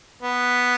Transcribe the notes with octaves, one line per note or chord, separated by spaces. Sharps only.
B3